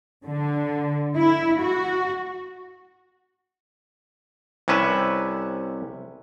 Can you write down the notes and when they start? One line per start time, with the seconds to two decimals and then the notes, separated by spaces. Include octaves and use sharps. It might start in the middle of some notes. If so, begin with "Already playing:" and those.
0.25 D3
1.16 E4
1.60 F#4
4.68 C2 C3 C#4 B4 E5